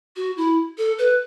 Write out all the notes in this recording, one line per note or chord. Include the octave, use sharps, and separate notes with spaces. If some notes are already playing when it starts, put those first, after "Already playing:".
F#4
E4
A4
B4